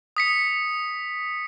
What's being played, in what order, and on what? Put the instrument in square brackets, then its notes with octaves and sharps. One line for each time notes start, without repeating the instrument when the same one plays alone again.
[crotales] D#6 B6 C#7